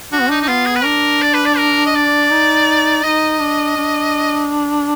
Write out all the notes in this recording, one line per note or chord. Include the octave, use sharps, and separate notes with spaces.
D4 F#4
B3
D4 D#4
D#4
D4
B3 F4
G#4
B4
D4 A#4
D5
B4
D5
A#4
D#5
D5
D#4
D#4 D#5
D4
D4